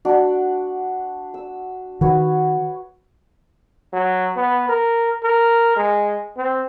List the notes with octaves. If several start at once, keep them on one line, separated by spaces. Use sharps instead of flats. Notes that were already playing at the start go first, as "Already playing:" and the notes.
D4 F#4 D5
E6
D#3 F#4 B4 C#5
F#3
B3
A#4
A#4
G#3
C4